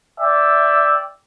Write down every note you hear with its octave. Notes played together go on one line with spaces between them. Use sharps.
D5 E5 G5